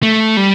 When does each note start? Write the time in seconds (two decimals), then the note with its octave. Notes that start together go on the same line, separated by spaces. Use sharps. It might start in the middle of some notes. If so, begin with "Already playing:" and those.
0.03 A3
0.37 G3